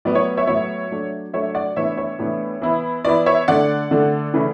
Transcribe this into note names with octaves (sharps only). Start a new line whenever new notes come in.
A2 F#3 B3 D5
C#5
C#5 E5
A2 F#3 B3 C#5 E5
F#3 A3 D4
F#3 A3 D4 C#5 E5
D5 F#5
A2 E3 B3 D4 C#5 E5
C#5 E5
A2 E3 B3 D4
E3 B3 E4
E3 B3 E4 D5
C#5 E5
D3 A3 D4 D5 F#5
D3 A3 D4
C#3 E3 A3 C#4 E4